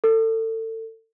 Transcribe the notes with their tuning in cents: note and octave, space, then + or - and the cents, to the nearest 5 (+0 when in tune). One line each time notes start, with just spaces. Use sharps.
A4 +30